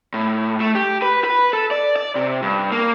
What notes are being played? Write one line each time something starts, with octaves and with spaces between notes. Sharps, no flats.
A2
A3
G4
B4
B4
A4
D5
D5
C3
G2
A#3